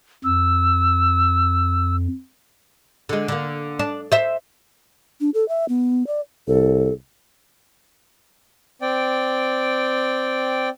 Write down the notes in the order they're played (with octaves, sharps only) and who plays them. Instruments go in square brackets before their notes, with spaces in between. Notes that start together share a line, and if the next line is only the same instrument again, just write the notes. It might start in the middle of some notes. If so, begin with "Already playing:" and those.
[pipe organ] F2 [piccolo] E6
[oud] D3 G#3
D3 A#3
D4
C5 E5
[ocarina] D4
A4
E5
B3
D5
[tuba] C2 [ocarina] A4
[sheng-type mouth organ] C4 D5 G5